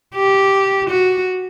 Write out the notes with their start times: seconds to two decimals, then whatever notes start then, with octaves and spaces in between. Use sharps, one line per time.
0.15 G4
0.89 F#4